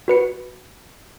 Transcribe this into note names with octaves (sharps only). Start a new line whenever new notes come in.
F#4 B4 C#7